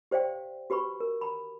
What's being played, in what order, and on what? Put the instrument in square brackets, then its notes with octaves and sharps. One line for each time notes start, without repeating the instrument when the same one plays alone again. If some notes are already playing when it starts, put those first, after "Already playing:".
[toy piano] G4 C5 D5 F5 G5
F#4 G4 B4 B5 C#6
A#4
A#5 B5